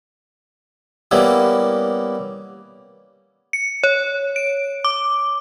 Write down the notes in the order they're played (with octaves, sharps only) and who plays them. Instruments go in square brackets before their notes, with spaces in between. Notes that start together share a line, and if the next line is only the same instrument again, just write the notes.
[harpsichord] G3 A#3 B3 C#4 E4
[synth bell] C#7
C#5
D7
D6